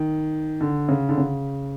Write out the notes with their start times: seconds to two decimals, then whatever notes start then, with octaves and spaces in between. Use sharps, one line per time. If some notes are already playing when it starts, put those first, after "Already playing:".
Already playing: D#3
0.61 D3
0.89 C#3
1.09 D3
1.18 C#3